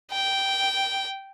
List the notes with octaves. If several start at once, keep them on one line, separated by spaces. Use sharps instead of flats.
G5